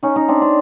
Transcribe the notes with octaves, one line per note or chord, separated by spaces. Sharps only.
C#4 D#4
C#4 D#4
C4 D4
C4 D4